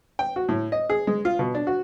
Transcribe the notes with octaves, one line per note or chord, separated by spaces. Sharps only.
G5
F#4
A2
D#5
G#4
G#3
F4
B2
D4
F#4